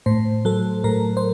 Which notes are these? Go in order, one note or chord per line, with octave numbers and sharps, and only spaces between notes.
A2 C5
F#3 A4
A2 A#4
C5